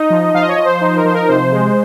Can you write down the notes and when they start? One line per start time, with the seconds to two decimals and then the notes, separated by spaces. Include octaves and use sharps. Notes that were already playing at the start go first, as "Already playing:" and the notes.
Already playing: D#4 D#5
0.10 F3
0.34 F3 F5
0.42 D#5
0.48 C#5
0.56 F3 D#5
0.65 C5
0.81 D#4
0.97 A#4
1.05 F3 C5
1.14 A#4
1.28 C3 C5
1.52 G#3